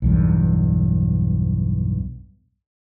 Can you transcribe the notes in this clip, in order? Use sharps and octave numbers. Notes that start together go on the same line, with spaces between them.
B1 E2 G2